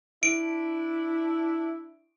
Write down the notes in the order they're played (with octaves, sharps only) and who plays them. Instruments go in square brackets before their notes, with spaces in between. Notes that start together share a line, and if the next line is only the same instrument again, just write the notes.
[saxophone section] D4 E4 [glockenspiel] D7